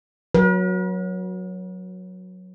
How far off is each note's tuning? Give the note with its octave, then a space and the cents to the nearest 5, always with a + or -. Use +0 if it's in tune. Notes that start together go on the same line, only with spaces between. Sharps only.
F#3 -10 B4 -45